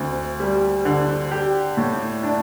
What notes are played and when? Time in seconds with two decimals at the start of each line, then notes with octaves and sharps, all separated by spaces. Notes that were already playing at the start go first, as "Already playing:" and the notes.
Already playing: D2 C4
0.40 G3
0.85 D3
1.31 G4
1.77 A2
2.23 D4